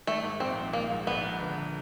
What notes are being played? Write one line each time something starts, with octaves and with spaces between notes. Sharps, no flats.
D#3 A3
G#2
A#1 C4
A#1
D#3 A#3
G#2
A#1 B3
A#1
D3